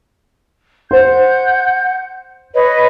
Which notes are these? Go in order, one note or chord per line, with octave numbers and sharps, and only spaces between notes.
C5 F#5 G6
B4 C#5 D#5